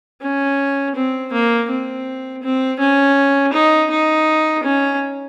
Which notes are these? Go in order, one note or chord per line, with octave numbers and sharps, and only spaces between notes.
C#4
C4
A#3
C4
C4
C#4
D#4
D#4
C#4